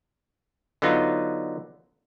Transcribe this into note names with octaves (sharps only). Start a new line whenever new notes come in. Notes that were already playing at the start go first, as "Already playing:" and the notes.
D3 F#3 B3 D#4 F4